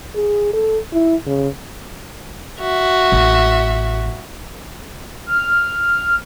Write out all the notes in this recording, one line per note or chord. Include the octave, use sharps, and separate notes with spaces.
G#4
A4
E4
C#3
F#4 E5
A1
F6